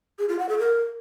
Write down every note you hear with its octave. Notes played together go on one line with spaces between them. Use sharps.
G#4
F4
F#5
A4
A#4